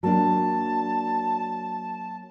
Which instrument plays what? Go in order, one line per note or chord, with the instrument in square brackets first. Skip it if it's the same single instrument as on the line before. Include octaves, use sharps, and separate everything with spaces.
[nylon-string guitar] F#3 A#3 D4 [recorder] A5